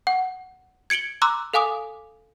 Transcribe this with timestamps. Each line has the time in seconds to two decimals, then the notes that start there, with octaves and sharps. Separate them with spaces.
0.07 F#5
0.90 G#6 C#7 D7 F#7 G7
1.22 A#5 C6 D6 E6 F#6
1.53 A4 F5 G#5 D6 D#6